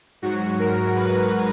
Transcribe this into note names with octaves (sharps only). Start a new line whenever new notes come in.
G#2 F#3 F#4
A#4
B4